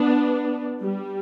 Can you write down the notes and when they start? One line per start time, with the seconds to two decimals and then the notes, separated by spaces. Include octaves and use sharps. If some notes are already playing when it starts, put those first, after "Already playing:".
Already playing: B3 D4
0.81 G3